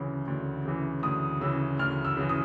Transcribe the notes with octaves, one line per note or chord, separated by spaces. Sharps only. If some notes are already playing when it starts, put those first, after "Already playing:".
Already playing: D2 C#3 E3
D2
C#3 E3
D2 D#6
C#3 E3 E6
D2 F6
E6
C#3 E3
D#6